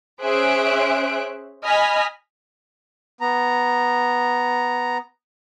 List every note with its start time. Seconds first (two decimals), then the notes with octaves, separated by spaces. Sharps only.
0.23 C#4 G#4 C5 E5 F#6 D7
1.65 D#5 G#5 B5 F6 B6
3.21 B3 A#5